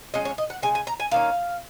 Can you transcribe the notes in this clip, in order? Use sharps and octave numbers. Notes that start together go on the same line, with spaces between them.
F3 G#3 C#4 D#5
C#5
D#5
F#5
C#3 G#3 G#5
G#5
A#5
G#5
D#3 A#3 C#4 F5